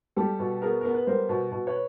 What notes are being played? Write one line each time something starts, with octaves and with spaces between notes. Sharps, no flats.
G3 G4 A4
B2
B3 G#4 A#4
B3 A#4
B4
G3 A#4 C5
B2
B2
B4 C#5